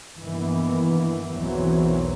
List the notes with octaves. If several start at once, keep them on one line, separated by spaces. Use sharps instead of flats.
G2 D#3 E3 A#3 B3
B1 E2 E3 F#3 A#3 C4